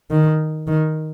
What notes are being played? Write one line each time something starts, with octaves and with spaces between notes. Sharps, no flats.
D#3
D#3